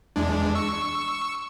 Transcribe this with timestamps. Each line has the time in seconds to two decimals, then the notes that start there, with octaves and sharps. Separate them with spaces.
0.16 E2 G#3 D4
0.55 C#6 E6